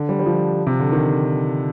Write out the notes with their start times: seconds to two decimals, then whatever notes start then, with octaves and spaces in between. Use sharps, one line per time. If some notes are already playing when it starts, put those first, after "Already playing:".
Already playing: D3
0.09 G3
0.19 G3
0.26 F3
0.67 C3
0.80 D3
0.92 D#3